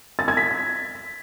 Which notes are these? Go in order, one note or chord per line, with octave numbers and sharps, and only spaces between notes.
A6
G#6
B6